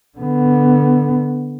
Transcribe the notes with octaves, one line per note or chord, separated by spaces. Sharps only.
D3 B3